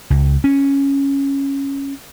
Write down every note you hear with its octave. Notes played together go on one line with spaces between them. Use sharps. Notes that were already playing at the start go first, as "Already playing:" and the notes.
C#2
C#4